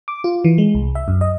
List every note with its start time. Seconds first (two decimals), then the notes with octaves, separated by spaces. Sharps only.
0.08 D6
0.24 F4
0.44 E3
0.58 G#3
0.75 C2
0.95 E5
1.08 F#2
1.21 D#5